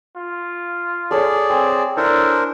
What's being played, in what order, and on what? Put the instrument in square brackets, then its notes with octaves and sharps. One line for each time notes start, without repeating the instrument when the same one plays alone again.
[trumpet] F4
[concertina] G#4 D5 [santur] A4 C#5
[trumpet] C4 [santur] G#5
[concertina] D4 A#4 C5 [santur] E4 [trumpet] A4